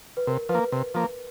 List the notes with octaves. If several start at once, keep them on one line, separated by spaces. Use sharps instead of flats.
B4
C3 A#4
F3 B4
A#3
C3
F3 A#3